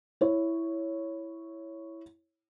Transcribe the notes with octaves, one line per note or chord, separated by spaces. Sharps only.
E4 C#5